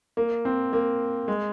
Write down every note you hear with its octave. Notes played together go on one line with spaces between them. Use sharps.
A#3
C4
A#3
G#3